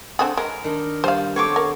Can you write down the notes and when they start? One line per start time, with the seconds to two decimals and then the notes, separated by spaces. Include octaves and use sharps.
0.19 D3 C4 G#4 F#5
0.37 G#3 A#4 B4
0.64 D#3 D4
1.04 G3 C5 F5
1.36 B3 C4 A4 C#5 C#6 D6
1.56 A#4